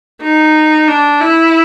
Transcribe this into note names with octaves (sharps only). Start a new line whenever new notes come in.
D#4
D4
E4